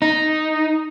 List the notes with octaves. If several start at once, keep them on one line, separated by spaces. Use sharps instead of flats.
D#4